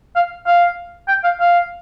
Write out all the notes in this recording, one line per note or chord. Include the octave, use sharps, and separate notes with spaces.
F5
F5
G5
F5
F5